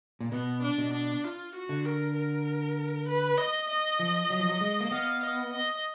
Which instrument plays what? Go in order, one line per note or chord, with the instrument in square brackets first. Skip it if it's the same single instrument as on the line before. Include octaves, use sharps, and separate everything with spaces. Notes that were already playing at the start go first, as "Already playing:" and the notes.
[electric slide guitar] A#2
[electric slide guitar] B2 [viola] B3
[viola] D4
[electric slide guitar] B2
[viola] D4
F4
F#4
[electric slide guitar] D3
[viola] A#4
A#4
B4
D#5
D#5
[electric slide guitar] F3
F#3
F3
F#3
G#3
A#3
[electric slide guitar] B3 [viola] F5
[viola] D#5
D#5